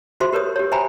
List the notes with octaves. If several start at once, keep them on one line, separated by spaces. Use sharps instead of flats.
F4 F#4 G#4 C5 E5 C6
G4 A#4 B4 C#5 D#6
G4 C#5
C5 E5 G5 G#5 A#5 B5